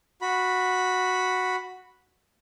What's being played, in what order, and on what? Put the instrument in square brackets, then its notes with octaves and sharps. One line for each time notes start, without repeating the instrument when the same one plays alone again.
[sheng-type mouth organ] F#4 B5